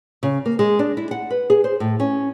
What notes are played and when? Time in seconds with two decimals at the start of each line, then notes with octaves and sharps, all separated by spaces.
0.23 C#3
0.46 A#3
0.59 G#3
0.79 D4
0.97 E4
1.11 F#5
1.30 B4
1.50 G#4
1.64 C5
1.80 A2
2.00 C#4